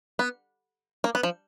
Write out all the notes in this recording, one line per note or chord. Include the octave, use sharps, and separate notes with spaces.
B3
A#3
B3
F3